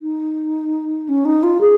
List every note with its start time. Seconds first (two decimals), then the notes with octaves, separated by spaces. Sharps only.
0.02 D#4
1.09 C#4
1.25 D#4
1.43 F4
1.61 G#4